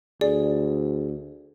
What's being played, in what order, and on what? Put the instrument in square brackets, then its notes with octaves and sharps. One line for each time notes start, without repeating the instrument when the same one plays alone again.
[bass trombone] D2 [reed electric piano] G#4 [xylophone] D5